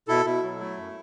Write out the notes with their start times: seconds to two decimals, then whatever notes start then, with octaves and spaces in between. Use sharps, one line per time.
0.08 B2 E4 A4
0.25 B2 E4
0.43 F#3
0.60 A3
0.77 F#2